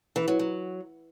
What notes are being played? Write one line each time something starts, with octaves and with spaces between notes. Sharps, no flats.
E3
F#3
F#3